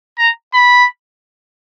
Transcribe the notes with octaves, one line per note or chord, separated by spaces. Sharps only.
A#5
B5